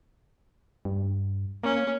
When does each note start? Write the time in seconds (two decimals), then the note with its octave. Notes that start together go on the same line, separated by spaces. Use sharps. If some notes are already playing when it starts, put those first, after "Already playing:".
0.85 G2
1.63 A#3 C#4